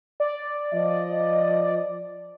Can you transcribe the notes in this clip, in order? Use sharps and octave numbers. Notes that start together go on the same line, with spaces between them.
D5
F3 D#5